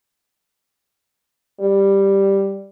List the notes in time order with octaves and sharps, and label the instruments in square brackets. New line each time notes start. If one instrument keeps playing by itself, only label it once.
[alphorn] G3